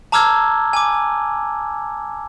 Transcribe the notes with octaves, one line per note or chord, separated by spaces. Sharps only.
A5 A#5 D6 E6 F6 G#6
G#5 D6